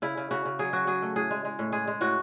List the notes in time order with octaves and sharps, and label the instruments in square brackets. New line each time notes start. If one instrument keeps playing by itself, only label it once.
[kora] C#3 E4
C#3
C#3 F#4
C#3
F#3 G#4
F#3 F#4
F#3 G#4
A3
A2 G#4
G#3
G#3
A2
G#3 G#4
G#3
A2 F#4